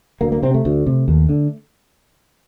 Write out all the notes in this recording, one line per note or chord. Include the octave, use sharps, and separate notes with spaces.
D2 A#3
A#3
C3 C4
A3
D2
C3
D#2
D3